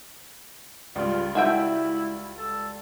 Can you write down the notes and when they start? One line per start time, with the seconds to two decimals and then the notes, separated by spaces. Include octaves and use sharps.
0.95 C#2 G3 F4
1.35 E4 F#4 E5 G5
2.38 A4